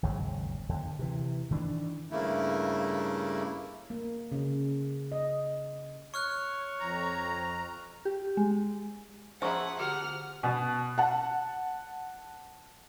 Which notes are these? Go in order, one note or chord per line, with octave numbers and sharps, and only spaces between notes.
G#1 D#2 C#3 F#3
D#2 D3
C3 E3
D#3 E3 A#3 D4
G2 C#3 A3 A#3 E4
A#3
C#3
D#5
C#5 C#6 F6 F#6
F2 A#5
G4
G#3
F3 G#4 E5 F#5 A#5 C#6
D3 F#4 G4 F#5 F6
B2
F#5 A5